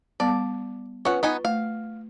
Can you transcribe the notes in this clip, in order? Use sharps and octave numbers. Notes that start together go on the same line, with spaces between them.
G3 B3 D5 A5
C#4 F4 B4 F#5 C#6
B3 D#4 G#5
A3 F5